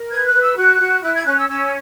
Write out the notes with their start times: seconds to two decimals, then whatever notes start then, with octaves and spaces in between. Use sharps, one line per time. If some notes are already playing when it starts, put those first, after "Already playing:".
Already playing: A#4
0.10 B4 G#6
0.26 F#6
0.33 B4
0.41 E6
0.56 F#4 F#6
0.80 F#4
1.02 E4 F#6
1.14 G#6
1.25 C#4 F#6
1.37 E6
1.49 C#4 E6